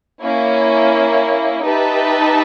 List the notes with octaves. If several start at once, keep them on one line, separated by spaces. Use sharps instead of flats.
A#3 C#4 E4
D#4 G4 B4 E5 A5